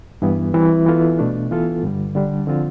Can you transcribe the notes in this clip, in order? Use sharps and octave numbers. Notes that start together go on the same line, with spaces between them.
G2 E3 B3
E3 G3 C4
E3 B3 F4 A4
B2 A3 D4
E3 B3 F4 A4
G2 D3 G3
D3 G3 D4
D3 F3 C4 F4